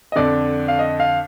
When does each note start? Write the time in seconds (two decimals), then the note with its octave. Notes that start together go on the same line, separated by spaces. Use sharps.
0.12 D#5
0.16 F2 D3 D5
0.68 F5
0.79 D#5
1.00 F5